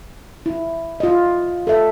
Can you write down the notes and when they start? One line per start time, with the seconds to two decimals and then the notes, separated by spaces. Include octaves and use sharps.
0.46 E4
1.00 F4 D#5
1.67 A4 E5